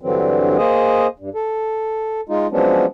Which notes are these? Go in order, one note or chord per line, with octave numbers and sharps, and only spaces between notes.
G2 D3 E3 F#3 C4
A#3 G#4 C5 D#5
G2
A4
G#3 D#4 F4
F3 F#3 G#3 B3 C#4 D4